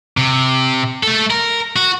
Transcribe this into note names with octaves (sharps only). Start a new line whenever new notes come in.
C3
A3 A4
A#4
F#4